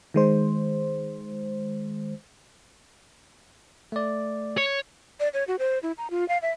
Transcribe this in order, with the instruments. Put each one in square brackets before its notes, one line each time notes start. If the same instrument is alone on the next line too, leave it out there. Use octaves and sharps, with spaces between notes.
[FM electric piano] D#3 G#3 C5
[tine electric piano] A3 D5
[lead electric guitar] C#5
[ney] D5
C#5
F#4
C5
E4
A#5
F4
F5
E5